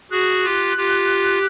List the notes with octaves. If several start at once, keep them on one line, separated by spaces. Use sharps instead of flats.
F#4 G#4 F#6
F4 G4
F4 G4